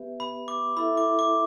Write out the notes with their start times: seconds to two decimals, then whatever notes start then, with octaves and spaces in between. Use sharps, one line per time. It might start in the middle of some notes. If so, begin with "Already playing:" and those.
Already playing: B3 G4 B4 E5
0.20 B5
0.48 D6
0.76 E4 A4 E5 B5
0.97 D6
1.19 D6